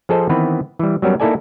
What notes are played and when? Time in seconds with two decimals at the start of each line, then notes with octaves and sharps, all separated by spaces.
0.09 F3 G#4 A4 C5 D#5
0.29 D#3 E3 B3 C4 B4
0.79 E3 G3
1.02 F#3 G3 B3 C#4 A#4
1.20 A#3 D#4 E4 A4 D5 G#5